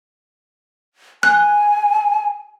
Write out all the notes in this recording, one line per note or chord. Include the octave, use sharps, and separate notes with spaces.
G#5 F#6